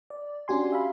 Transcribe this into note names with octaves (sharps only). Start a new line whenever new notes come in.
D5
C#4 D4 F#4 G4 G#5 C6
E5 F5 B5